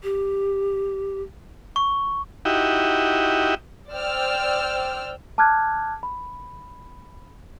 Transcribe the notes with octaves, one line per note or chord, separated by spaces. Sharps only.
G4
C#6
D#4 E4 F#4 G4
C5 D5 G5 E6 F6
A5 D6 F6 F#6 G#6
B5